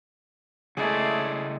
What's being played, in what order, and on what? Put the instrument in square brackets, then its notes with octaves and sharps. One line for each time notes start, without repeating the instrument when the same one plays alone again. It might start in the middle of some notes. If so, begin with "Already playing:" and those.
[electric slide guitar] C#3 E4 E5 [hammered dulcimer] G#3 G#4 [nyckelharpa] A3 D5